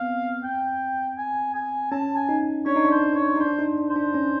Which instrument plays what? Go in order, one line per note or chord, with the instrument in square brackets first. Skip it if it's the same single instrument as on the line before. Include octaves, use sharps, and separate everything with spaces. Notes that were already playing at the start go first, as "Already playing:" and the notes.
Already playing: [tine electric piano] B3 C4 [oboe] F5
[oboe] G5
G#5
G#5
[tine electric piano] C#4 [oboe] A5
[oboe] G#5
[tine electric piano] D#4
[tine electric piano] D4 [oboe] C#5
[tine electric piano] D#4
D4
[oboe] C5
C#5
[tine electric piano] D#4
[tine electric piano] D4 [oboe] C5
[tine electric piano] D#4
D4
[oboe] C5
[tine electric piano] D4
C#4